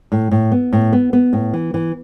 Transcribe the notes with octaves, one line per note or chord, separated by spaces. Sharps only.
A2
A2
B3
A2
B3
B3
A2
E3
E3